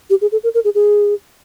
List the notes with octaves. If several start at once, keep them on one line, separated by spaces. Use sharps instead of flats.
G4
G#4
A4
A#4
A#4
G#4
G#4